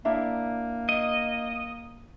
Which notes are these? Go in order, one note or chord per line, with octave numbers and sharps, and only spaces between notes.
A#3 D4 E4 E5
D#5